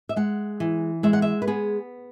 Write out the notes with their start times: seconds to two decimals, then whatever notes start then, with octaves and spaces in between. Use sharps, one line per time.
0.09 E5
0.16 G#3 F#5
0.60 E3
1.03 G#3 E5
1.13 F#5
1.22 E5
1.42 B4
1.47 B3 G#4